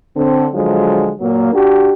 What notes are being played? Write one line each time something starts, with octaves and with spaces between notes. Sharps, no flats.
D3 C4
D3 F3 F#3 G#3
A#2 F#3 A#3
D4 F#4 G4